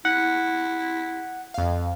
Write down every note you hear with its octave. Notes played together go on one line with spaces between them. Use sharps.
E4 F#5
F2 F5